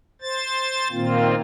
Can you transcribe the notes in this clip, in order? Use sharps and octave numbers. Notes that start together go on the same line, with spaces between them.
C5 A6
A#2 D#3 A#3 C4 F4